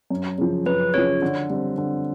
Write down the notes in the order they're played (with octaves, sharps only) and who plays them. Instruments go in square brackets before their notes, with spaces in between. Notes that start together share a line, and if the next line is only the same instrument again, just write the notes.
[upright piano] F#2
C#3 F3
[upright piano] F#2 [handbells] B4
[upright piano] C#3 F3 [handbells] C#5
[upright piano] D3
G3 C4
D3